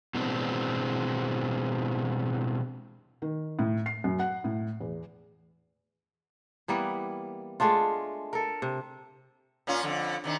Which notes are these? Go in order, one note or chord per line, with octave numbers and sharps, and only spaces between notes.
B2 E3 G#3 B3 C4 D4
D#3
A2
C7
F#2
F#5
A2
E2
E3 G3 A#3 B3
G#3 A3 D4 F4
A4 A#4
C3
A#2 C#4 F4
F2 D3
C3 D#3 D4